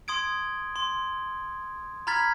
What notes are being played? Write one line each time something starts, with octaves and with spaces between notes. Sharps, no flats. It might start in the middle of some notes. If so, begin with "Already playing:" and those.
C6 D#6 G#6 D7
C6
A#5 B5 F6 G#6 A6 B6